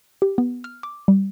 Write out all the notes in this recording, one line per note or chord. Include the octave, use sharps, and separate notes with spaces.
G4
B3
F6
D6
G3